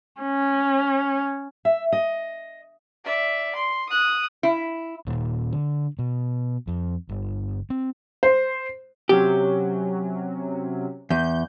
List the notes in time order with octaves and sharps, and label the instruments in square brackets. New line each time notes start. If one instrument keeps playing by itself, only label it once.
[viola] C#4
[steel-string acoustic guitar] E5
D#5
[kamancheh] D5 E5
C6
D#6 F#6
[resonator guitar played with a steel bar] E4
[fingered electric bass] D#1
D3
B2
F2
G1
C4
[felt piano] C5
[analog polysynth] C3 F#3 C#4 [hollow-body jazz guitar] G4
[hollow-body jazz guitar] E2 [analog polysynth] G6